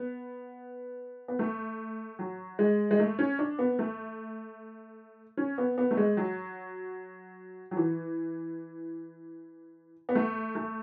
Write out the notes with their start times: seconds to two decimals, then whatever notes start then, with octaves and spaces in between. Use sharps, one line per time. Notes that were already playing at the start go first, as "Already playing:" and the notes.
Already playing: B3
1.28 B3
1.39 A3
2.19 F#3
2.59 G#3
2.91 G#3
2.99 A3
3.19 C#4
3.39 D4
3.59 B3
3.79 A3
5.37 C#4
5.58 B3
5.78 B3
5.91 A3
5.97 G#3
6.17 F#3
7.71 F#3
7.77 E3
10.09 B3
10.15 A3
10.55 A3